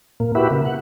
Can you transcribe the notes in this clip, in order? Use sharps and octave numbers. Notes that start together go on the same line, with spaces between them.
A#2 A#3
E4 F#4 G4 B4 E5
C#3 A#3
F#5